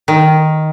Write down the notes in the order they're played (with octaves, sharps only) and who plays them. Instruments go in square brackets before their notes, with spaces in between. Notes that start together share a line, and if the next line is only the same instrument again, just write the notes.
[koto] D#3